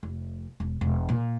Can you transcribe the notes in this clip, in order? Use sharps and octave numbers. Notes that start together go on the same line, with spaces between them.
F1
E1
E1
A#2